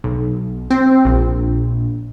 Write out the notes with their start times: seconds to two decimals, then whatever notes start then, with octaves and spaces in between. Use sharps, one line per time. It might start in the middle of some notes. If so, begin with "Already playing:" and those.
0.04 B1
0.70 C4
1.05 A#1